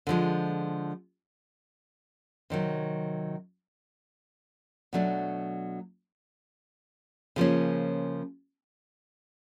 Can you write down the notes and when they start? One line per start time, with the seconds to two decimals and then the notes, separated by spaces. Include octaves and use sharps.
0.07 D3 F3 G#3
2.50 C3 D#3 F#3
4.93 B2 F#3 A3 D4
7.36 C#3 F3 A#3 C#4